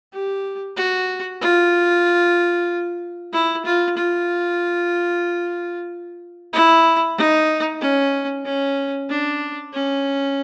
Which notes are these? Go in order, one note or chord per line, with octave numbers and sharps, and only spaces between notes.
G4
F#4
F4
E4
F4
F4
E4
D#4
C#4
C#4
D4
C#4